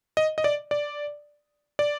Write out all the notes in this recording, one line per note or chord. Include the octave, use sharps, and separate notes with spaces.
D#5
D#5
D5
D5
D5